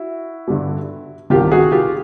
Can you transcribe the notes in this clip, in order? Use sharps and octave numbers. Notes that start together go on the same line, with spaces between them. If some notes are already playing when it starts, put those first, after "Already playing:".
Already playing: E4 F#4
G2 D3 G3
C2 C3 D#3 F4 G4
F#4 G#4
F4 G4